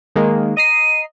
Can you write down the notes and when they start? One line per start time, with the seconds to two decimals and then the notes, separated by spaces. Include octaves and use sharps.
0.15 D#3 G#3 A#3
0.57 D#5 A#5 C7 D#7